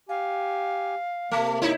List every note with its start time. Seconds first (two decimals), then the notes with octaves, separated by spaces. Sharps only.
0.09 G4 F5 G#5
1.31 C3 A3 A#3
1.62 D#4 E4 C#5